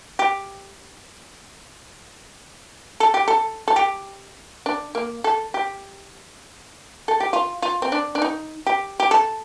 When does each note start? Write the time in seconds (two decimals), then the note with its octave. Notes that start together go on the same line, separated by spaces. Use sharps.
0.19 G4
3.00 A4
3.14 G4
3.28 A4
3.68 A4
3.76 G4
4.66 D4
4.95 A#3
5.24 A4
5.54 G4
7.08 A4
7.20 G4
7.33 F4
7.62 F4
7.82 C4
7.92 D4
8.15 D4
8.22 D#4
8.67 G4
9.00 G4
9.11 A4